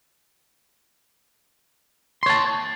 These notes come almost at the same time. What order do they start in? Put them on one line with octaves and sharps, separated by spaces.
C6 C#5 A5